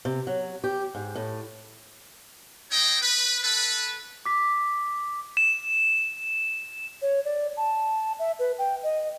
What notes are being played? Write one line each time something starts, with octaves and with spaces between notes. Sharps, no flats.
C3
F#3
G4
G#2
A2
C4 D#4 C#5 D#5 G5
B4
A4 B4
D6 B6
E7
C#5
D5
A5
E5
B4
G5
D#5